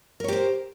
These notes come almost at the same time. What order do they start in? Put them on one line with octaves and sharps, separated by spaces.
A#4 C#5 G4 C5